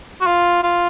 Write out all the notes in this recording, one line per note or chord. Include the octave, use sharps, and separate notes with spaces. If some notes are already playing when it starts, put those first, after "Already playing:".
F#4
F4
F4